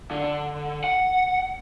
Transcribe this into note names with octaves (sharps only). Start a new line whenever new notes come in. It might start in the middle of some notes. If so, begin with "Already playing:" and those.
D3
F#5